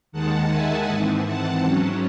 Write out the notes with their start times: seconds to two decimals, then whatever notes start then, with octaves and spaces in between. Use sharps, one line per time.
0.12 D#2 D#3 G#3 F#5 A5
0.50 E5 G#5
0.89 G#2 E3 C4
1.27 F#5 A5
1.64 G#2 F#3 C#4